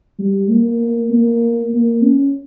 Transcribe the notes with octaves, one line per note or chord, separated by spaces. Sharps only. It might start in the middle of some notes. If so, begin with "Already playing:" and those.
G3
A#3
A#3
A#3
C#4